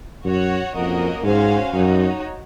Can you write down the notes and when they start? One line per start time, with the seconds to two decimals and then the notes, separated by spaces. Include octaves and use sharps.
0.24 F#2 F#4 C#5 F#5
0.75 F2 A#3 C#4 F#4 A#4 D#5
1.24 G#2 C#4 F#4 C5 F5 G#5
1.74 F#2 D#4 F#4 C#5